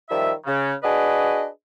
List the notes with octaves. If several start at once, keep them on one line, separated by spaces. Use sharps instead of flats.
D#3 F3 G3 E5
C#3
D4 F#4 G#4 B4 D#5